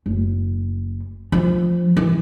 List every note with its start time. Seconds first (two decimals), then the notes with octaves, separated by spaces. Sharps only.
0.06 F#1
1.32 F3
1.97 E3